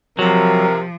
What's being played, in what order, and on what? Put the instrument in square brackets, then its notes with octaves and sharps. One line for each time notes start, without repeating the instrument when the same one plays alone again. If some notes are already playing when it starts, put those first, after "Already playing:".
[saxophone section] C3 [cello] F3 [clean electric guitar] F#3 [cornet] A#4